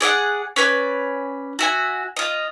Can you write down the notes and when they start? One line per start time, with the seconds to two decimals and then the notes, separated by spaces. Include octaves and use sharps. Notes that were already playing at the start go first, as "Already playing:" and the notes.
0.01 G#4 D5 E5 F#5
0.56 C#4 B4 C5 D5
1.59 F#4 E5 G#5
2.16 F4 D#5